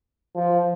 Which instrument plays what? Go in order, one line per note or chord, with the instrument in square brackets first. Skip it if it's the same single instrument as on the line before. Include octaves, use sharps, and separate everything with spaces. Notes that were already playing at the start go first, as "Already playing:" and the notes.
[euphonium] F3